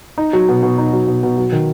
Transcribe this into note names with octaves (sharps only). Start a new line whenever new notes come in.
D#4
F#3
B2
B2
D#4
F#3
B2
B2
F#3
D#3